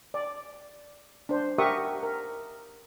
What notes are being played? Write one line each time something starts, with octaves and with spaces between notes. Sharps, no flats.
D5
D4 C5
G4 A#4 E5 F#5 C#6 D#6
A#4